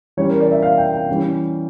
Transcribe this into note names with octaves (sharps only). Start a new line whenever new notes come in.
E3 G3 C#4 C#5
A#4
D5
E5
F5
G5
G5
E3 G3 C#4